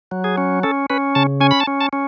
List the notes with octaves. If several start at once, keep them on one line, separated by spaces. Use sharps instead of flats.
F#3
G#4
C#4
C#4 A4
C#4 B4
C#3 A5
C#4 G#5
B5
A5
C#4
A5
C#4